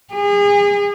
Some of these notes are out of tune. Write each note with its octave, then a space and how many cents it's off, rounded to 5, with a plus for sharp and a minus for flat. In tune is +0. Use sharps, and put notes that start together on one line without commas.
G#4 -35